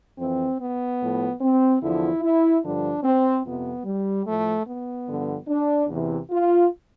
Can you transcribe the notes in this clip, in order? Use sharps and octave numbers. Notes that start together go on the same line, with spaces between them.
F2 E3 C4
B3
A2 F3
C4
E2 D3 F3 E4
E4
G2 D3 F3 D4
C4
F2 C3 F3 B3
G3
A2 F3 A3
B3
G2 D3 F3
D4
E2 C3 E3
F4